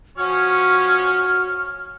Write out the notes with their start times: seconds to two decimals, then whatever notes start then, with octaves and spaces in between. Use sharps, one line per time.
0.18 F3 C#4 F#4 C#5 F6